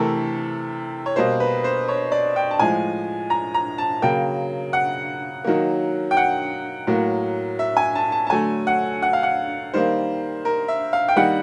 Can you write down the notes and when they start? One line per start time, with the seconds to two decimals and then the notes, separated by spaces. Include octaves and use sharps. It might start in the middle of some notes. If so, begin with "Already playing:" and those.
Already playing: C3 E3 A3 A4 A#4
1.06 C#5
1.16 B2 G3 A#3 C5
1.40 B4
1.64 C5
1.88 C#5
2.12 D5
2.36 G5
2.51 A5
2.59 A2 F3 G#3 G#5
3.30 A#5
3.54 A#5
3.78 A5
4.02 C#3 F#3 A#3 G5
4.73 F#5
5.44 D#3 F#3 A#3
6.11 G5
6.17 F#5
6.87 A2 F#3 A#3
7.59 E5
7.77 G#5
7.95 A5
8.12 A5
8.27 A5
8.30 D3 F#3 A3 G#5
8.67 F#5
9.02 F#5
9.13 F5
9.23 F#5
9.74 D#3 G3 A#3 C5
10.45 A#4
10.68 E5
10.93 F5
11.08 G5
11.16 D#3 G3 A#3 F#5